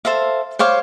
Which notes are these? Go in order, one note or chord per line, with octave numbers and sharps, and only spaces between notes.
A4 C5 E5 F5
C5 C#5 F5 D6